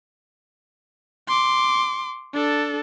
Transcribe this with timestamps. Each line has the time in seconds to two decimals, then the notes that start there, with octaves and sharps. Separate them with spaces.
1.28 C6 D6
2.34 D4 A4